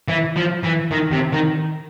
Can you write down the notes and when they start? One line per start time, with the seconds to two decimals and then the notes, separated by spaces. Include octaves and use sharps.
0.08 E3
0.36 F3
0.63 E3
0.91 D#3
1.12 C3
1.33 D#3